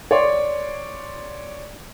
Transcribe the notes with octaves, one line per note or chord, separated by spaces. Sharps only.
C#5 D5 C6